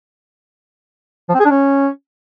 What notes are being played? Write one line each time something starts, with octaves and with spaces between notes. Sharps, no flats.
F3
C4
G#4
D4
C#4